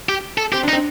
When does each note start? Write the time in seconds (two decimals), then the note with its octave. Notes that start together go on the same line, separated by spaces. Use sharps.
0.09 G4
0.38 A4
0.52 C4 G4
0.63 D4 D#4
0.73 C4